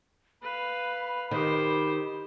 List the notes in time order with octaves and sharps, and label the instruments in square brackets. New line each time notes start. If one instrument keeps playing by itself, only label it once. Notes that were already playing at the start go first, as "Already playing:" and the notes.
[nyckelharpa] B4 F5 [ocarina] B5
[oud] D#3 [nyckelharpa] G4 C5